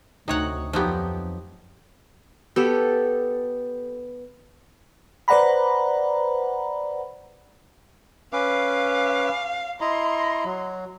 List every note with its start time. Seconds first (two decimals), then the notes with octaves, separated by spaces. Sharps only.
0.28 D2 C3 D#4 C#5 F#5
0.73 F2 F3 F#3 B3 D#4 G4
2.56 B3 G4 A4
5.28 B4 C5 D5 F#5 A#5 B5
8.33 C#4 B4 F5 D6
9.81 E4 D#5 A#5 C6
10.45 F#3